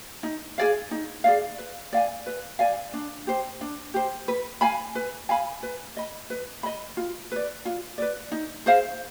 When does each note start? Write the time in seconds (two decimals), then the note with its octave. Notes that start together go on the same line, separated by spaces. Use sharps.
0.23 D#4
0.58 G#4 D5 F5
0.91 D#4
1.24 G#4 D5 F5
1.58 B4
1.93 D5 F5 G#5
2.26 B4
2.59 D5 F5 G#5
2.94 D4
3.27 G4 C5
3.61 D4
3.94 G4 C5
4.28 B4
4.61 F5 G#5 B5
4.95 B4
5.29 F5 G#5 B5
5.63 B4
5.97 D#5 B5
6.30 B4
6.63 D#5 B5
6.97 F4
7.32 B4 D5
7.65 F4
7.98 B4 D5
8.32 D#4
8.66 G#4 C5 F5